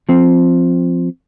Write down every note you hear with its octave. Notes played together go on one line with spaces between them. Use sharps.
F3 C4